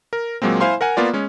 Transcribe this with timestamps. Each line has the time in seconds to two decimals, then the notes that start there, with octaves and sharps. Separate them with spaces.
0.13 A#4
0.42 A#2 F#3 G#3 A#3 C4
0.60 E4 C5 F5 G#5 C6
0.81 A#4 F#5 G#5
0.97 A#3 B3 F4 D5
1.13 G#3 C#4